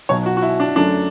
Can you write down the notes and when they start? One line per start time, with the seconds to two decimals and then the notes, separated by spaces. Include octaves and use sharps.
0.09 B1 B2 F#3 C#5
0.26 F#4
0.37 F#4
0.42 E4
0.60 D4
0.76 F#2 D3 F#3 A3 D4